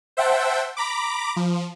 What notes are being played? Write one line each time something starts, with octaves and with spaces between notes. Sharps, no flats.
C5 E5 F#5 G5 A5
A#5 B5 D6
F3